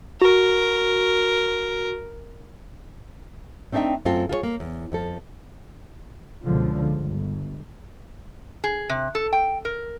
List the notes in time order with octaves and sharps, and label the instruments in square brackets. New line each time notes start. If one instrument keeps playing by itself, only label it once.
[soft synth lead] F#4 [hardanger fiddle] A#4
[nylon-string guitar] A3 C4 D4 D#4 E5 G5
F#2 A3 C4 F4 A4
F4 G#4 A#4 C#5
A#3
E2
F2 F3 A4
[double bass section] C#2 B2 D3 F3
G1
[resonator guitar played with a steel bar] G#4
C3
A4
G5
A#4